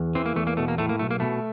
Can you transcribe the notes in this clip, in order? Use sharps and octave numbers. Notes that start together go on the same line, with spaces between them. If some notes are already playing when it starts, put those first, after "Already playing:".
Already playing: E2
E3 C4
A#3
E2 A3
A#3
B2 A3
A#3
A2 A3
A#3
B1 A3
A#3
B2 A3